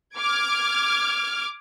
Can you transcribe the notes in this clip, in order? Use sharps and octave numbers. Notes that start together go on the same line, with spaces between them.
D6 F6 G#6 D7